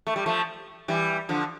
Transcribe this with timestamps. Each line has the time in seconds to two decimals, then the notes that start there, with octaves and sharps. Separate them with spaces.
0.07 A3
0.16 G3
0.26 F3 A3
0.88 E3 G3
1.29 D3 F3